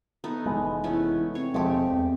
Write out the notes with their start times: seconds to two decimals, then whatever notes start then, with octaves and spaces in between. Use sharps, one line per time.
0.24 A3 B3 D#4
0.46 F1 E3 G#3
0.84 A3 B3 C#4 E4
1.35 C4 C#5
1.54 E1 F3 G#3 A3 G4
1.91 E2